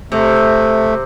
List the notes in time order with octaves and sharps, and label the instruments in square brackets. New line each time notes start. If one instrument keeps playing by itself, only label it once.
[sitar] C3 [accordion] A3